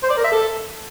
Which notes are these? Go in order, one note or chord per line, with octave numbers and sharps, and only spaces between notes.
C5
D5
A#4
E5
A4